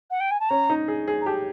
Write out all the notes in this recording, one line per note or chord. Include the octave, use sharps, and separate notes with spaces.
F#5
G5
G#5
A5
C#4 A#5
D#4
G#4
G#4
A#5
G4 A5